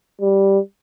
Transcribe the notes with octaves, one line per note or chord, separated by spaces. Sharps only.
G3